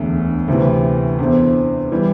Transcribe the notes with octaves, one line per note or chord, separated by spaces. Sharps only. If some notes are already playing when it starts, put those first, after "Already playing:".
Already playing: E1 D2 D3
D2 C3 E3
E2 D3 C4
E3 G3